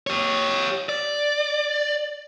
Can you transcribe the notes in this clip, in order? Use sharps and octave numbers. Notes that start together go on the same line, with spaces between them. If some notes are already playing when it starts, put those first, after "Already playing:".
G4 C#5
D5